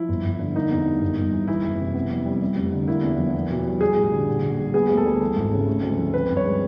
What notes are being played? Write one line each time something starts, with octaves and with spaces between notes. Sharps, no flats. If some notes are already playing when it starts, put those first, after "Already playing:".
Already playing: F3 E4
G1
G1
D3
A#3 D#4
E2
G3
G1
G1
E3
E3 E4
F#1
C3
B3
F2
G3
G3
F1
D3
A#3 E4
E2
F3
B3
B1
G3
G3 G#4
A1
D3
A#1
A#1
G3
B3 G#4
D2
A4
G3
E3
G#1
C#3
A3
D2
F3
C4 B4
G2
C#5
G#3